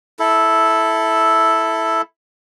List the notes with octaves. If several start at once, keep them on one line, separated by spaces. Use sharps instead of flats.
E4 A4